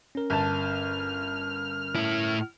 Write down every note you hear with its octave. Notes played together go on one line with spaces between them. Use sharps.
C#4 A#4
G1 A5 F6
A2 E4